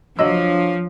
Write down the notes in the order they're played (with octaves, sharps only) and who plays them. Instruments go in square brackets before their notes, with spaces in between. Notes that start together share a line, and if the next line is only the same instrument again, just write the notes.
[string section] F3 [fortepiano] F#3 D#5 E6 [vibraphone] D4 C#5